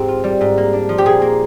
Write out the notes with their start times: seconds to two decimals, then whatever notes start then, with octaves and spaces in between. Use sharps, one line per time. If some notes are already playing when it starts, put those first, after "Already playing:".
Already playing: G#2 C4 G4
0.08 F4
0.24 G3
0.41 G#2
0.58 A#3
0.73 D4
0.89 F3
0.98 G4
1.05 A#2 G#4
1.22 A#3